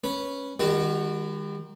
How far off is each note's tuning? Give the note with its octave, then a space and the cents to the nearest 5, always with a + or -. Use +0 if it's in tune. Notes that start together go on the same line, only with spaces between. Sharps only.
C#4 +0 B4 -10
D#3 +0 G3 +45 F#4 +0